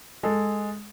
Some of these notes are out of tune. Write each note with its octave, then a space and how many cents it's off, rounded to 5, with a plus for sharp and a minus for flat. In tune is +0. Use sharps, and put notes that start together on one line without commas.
G#3 +0 A4 +0